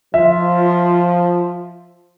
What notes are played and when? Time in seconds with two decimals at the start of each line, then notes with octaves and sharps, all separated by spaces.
0.14 F3 F4 E5